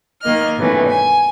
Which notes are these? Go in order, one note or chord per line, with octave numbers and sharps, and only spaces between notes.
D#3 A#3 D#5 F6
G2 B2 D#3 E3 A3 C#4
G#5